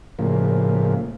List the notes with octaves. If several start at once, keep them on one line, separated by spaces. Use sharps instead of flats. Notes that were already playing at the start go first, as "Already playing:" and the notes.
A2 C#3 F3 A#3